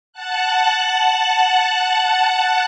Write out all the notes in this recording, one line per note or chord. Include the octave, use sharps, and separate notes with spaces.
F#5 A5 F#6